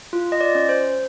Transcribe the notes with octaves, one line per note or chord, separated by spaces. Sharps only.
F4
D#5
D5
C#4
C5